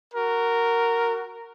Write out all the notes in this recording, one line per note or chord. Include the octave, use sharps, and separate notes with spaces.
F#4 A#4